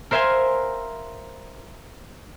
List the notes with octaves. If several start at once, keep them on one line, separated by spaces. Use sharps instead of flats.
A#4 C5 E5 F5 G#5 C6